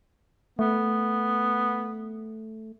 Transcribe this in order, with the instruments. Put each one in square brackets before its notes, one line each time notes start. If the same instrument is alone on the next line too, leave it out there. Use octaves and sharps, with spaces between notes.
[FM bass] A3 [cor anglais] B3